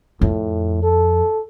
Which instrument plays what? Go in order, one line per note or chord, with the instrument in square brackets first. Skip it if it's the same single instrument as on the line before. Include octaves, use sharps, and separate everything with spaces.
[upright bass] F2 [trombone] A2
[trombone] A4